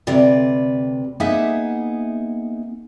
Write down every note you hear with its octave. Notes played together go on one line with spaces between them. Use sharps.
D2 C3 B4 D5
A#3 B3 D#4 G#4 E5 F#5